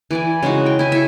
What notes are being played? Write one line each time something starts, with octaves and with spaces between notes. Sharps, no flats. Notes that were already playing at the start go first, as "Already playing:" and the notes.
E3 D5 G#5
C#3 G#3 D#4 F#4
G5
E4 G#5
A4 E5